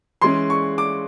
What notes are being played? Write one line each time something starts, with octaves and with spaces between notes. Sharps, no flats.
E3 G#3 C#4 C6
C#6
D6